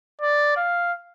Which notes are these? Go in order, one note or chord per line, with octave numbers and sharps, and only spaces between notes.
D5
F5